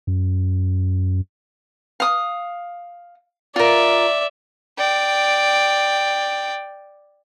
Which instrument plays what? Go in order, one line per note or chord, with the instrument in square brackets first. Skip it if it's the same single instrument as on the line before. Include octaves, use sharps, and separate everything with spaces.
[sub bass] F#2
[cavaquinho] F5 D#6
[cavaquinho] F4 A#4 [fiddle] D5 E5
[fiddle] D5 G5